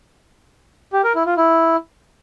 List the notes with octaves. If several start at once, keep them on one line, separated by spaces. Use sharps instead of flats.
G4
A#4
E4
F4
E4